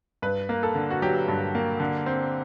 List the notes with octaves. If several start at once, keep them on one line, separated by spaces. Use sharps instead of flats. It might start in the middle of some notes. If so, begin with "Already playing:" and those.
G2 B4
A#3
A4
D3
F#4
F#3 G4
G2
A#3
D3
C4